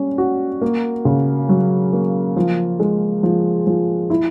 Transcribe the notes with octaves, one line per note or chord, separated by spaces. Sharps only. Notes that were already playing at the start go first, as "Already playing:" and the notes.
Already playing: G3 C#4
F#4
A#3
C#3
F#3
A#3
F3
G#3
F3
F3
E4